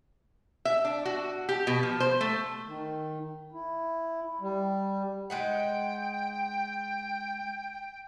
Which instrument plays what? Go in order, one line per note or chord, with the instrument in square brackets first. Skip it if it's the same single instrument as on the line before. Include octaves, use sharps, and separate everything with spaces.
[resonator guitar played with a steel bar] E5
D4
F#4
G4
B2
F3
C5
A3
[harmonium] D#3
E4
G3
[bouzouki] G#3 D#4 F#5 [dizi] G5